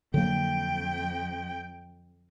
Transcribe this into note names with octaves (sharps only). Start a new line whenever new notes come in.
F2 D3 F#3 A#3 G5